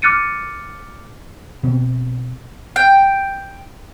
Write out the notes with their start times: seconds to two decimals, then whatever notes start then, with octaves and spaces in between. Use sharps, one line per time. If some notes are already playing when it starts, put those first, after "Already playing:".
0.02 D6 F6 F#6 A6 C#7 D#7
1.63 B2 B3 C4
2.76 G5